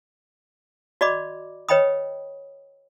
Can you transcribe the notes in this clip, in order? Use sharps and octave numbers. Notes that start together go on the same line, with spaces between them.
F#4 D5 D#5 B5 D6
B4 C#5 D#5 G5 B5 D#6